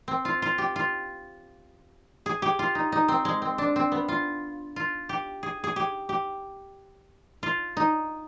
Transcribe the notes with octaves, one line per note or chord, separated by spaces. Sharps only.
C4
F4
F4
G4
F4
G#4
G4
F4
D#4
D#4
C4
G#3
C4
D4
C4
B3
F4
F4
G4
G#4
G#4
G4
G4
F4
D#4